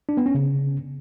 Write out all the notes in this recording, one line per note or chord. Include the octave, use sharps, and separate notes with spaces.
D4
B3
C#4
C#3